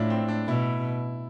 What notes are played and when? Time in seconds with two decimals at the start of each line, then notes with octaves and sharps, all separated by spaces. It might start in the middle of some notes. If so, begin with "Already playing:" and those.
Already playing: A2 D4 E4 F4
0.10 C4
0.28 D4
0.48 B2 E4